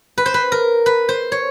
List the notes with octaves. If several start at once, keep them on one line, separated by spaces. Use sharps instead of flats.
B4
C5
B4
A#4
B4
C5
C#5